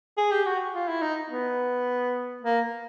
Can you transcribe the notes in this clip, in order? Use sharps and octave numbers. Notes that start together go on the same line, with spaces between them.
G#4
G4
F#4
F4
E4
D#4
B3
A#3